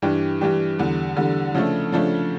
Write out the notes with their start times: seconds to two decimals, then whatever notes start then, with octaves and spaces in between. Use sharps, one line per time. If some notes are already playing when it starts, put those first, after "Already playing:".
0.02 G2 E3 G3 D4 G4
0.41 G2 E3 G3 D4 G4
0.78 E2 D3 G3
1.16 E2 D3 G3
1.55 C#3 F3 A3 D4 A4
1.92 C#3 F3 A3 D4 A4